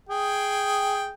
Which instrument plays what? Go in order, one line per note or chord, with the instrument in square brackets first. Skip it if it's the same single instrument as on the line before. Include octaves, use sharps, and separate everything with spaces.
[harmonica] G#4 G5